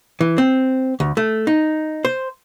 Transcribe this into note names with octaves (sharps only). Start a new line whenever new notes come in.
E3
C4
D2
A3
D#4
C5